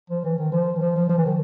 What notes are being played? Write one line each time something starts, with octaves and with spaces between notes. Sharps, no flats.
F3
E3
D#3
F3
E3
F3
F3
F3
E3
D#3